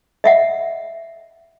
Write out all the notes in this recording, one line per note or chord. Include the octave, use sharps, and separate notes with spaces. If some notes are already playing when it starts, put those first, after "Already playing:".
D#5 E5 F#5